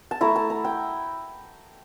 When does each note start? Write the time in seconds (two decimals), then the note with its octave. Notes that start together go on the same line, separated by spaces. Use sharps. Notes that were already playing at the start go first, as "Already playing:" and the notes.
0.11 A5
0.21 A3 E4 A#5
0.36 A5
0.50 A#5
0.65 G5